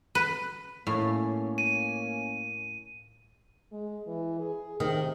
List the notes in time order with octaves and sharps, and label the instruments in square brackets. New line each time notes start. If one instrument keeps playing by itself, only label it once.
[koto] B4
[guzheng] A2 [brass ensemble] A#3 C#4
[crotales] D#7
[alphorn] G#3
E3
G#4
[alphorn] C3 [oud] D#3